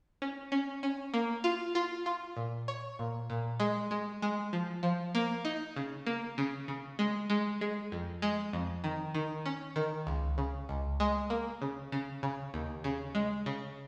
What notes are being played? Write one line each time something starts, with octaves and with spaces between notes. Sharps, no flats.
C#4
C#4
C#4
A#3
F4
F4
F4
A#2
C#5
A#2
A#2
G#3
G#3
G#3
F3
F3
A#3
D#4
C#3
A#3
C#3
C#3
G#3
G#3
G#3
F2
G#3
F2
D#3
D#3
C#4
D#3
C#2
C#3
C#2
G#3
A#3
C#3
C#3
C#3
D#2
C#3
G#3
C#3